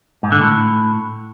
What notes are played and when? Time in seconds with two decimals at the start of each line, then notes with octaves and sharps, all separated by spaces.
0.23 G#2
0.32 D3
0.41 A2